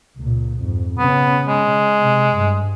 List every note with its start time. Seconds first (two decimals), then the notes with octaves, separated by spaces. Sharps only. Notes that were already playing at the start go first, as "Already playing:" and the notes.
0.17 C#2 A#2
0.61 F2 G#2
0.98 C#3 B3 C#4
1.47 G#3
2.00 C3
2.34 G2